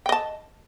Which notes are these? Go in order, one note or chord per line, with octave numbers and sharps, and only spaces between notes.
D#5 G5 A5